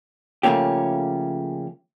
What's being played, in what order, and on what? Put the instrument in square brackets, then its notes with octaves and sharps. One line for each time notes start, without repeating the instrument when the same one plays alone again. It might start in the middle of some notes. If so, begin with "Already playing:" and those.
[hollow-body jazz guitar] C#3 F3 A3 A#3 C#4 G4